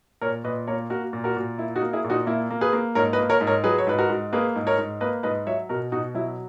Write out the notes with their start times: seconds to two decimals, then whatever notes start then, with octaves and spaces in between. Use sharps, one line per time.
0.21 A#2 A#4 C#5
0.44 A#2 B4 D#5
0.67 A#3 A#4 C#5
0.90 A#3 F#4 A#4
1.13 A#2
1.24 F#4 A#4
1.36 A#2
1.58 A#3 E4
1.76 D#4 F#4
1.82 A#3
1.93 E4 G#4
2.04 A#2
2.10 D#4 F#4
2.27 A#3 E4
2.50 A#3
2.61 G#4 B4
2.73 A#3
2.95 G#2 A#4 C#5
3.13 B4 D#5
3.19 A#3
3.30 A#4 C#5
3.41 G#2
3.47 A#4 C#5
3.64 F#3 G#4 B4
3.78 C#5
3.87 G#2 B4
3.98 F#4 A#4
4.09 G#2
4.33 A#3 G#4 B4
4.55 G#2
4.67 A#4 C#5
4.78 G#2
5.01 A#3 B4 D#5
5.23 G#2 B4 D#5
5.46 F#3 C#5 E5
5.69 B2 F#4 A#4
5.92 B2 D#4 F#4
6.15 F#3 E4